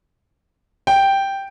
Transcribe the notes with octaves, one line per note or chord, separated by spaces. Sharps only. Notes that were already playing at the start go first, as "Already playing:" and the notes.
G5